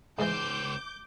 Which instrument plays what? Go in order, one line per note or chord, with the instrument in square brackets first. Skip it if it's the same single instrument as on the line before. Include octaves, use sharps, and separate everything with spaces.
[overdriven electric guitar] C#2 C5 [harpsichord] G#2 E3 [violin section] D6 G6